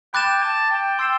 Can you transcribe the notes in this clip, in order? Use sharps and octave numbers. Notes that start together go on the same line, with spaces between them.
G5 B5 D6 F#6 A6 E7
A5
G5
G5 C6 E6 A6 C7 E7